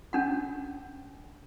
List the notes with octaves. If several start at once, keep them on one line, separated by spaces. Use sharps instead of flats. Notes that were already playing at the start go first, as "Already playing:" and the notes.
C#4 D4 F#5